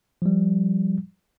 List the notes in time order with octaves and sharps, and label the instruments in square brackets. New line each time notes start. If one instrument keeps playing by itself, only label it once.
[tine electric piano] F3 G3